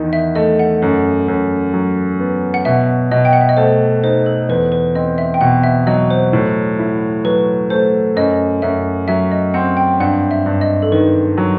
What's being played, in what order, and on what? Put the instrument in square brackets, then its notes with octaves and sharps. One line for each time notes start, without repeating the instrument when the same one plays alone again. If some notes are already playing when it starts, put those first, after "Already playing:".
Already playing: [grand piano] E2 D#3 D#4
[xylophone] E5
[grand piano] A3 [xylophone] D#5
[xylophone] F#5
[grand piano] F#2
F#2
F#3
B3
[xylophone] F#5
[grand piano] B2 [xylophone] E5
[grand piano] B2 [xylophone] D#5
[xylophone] G5
F#5
E5
D#5
[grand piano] A3 [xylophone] C5
[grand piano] D#4 [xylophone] C5
[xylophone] A4
[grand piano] E2 [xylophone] B4
[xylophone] B4
[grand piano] C4 [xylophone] D#5
[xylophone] E5
G5
[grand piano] B2 [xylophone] F#5
[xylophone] E5
[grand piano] F#3 [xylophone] D#5
[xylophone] C5
[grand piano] A2
E4
[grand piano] F#3 [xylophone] B4
[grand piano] A3 [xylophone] C5
[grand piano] F#2 [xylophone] D#5
[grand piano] F#2 [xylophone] E5
[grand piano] F#3 [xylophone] E5
[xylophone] D#5
[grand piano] C4 [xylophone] F#5
[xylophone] G5
[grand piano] G2 [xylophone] F#5
[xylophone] E5
[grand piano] G2
[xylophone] D#5
A4
[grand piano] D#3 [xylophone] B4
[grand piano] F#3